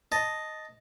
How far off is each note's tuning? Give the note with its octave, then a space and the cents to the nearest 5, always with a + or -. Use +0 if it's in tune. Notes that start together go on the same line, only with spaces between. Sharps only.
D#5 +0 A5 +0